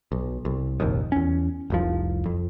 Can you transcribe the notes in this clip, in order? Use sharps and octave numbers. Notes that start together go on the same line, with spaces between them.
B1
C2
F1 A#1 D#2
E2 C#4
F1 C2 F3
F2